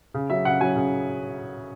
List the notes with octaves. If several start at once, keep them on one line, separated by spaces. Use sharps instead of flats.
C#3
F#3 C#4 E5
C#3 F#5
F#3 C#4 G#5
C#3